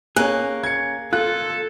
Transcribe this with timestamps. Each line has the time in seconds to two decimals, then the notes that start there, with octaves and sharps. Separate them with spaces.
0.16 A#3 C#4 G#4 F#6
0.63 G#6 C#7
1.13 F4 A4 F#6